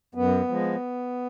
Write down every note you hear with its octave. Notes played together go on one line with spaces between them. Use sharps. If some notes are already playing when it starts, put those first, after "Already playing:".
F#2 B3
F3 G#3